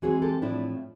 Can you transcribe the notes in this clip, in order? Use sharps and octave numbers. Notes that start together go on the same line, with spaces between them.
E3 G#3 C4 F#4 G#4
G4 A4
A2 F3 A3 C4 D4 E4